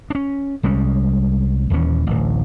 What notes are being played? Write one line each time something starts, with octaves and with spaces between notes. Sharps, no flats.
C#4 D4
C2 G3 G#3 C#4
D#1 D#2 E3 C#4
D1 A1